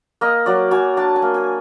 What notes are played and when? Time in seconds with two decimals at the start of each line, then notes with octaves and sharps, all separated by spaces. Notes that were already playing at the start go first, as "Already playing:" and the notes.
0.21 A#3 D#5
0.46 F#3 D5
0.71 F#3 G#5
0.97 D4 A5
1.16 G#5
1.22 A#3
1.34 G#5